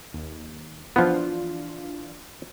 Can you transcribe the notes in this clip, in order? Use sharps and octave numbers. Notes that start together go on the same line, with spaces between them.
D#2
E3 F3 B3 D4 F4